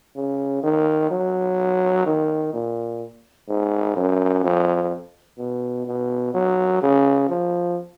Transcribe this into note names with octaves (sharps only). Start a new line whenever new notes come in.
C#3
D#3
F#3
D#3
A#2
G#2
F#2
F2
B2
B2
F#3
C#3
F3